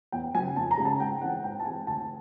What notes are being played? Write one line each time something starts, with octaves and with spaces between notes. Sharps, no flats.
E2 G5
C#3 F#3 G#5
F2 A5
A#5
C#3 F3 G#3
A5
G#2 G5
E3 G#3 C4 F#5
G#2 G5
A5
E3 G#3 C4 G#5
D2 A5